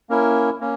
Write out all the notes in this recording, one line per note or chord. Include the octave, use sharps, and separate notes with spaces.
A#3 C#4 E4 A#4
A#3 C#4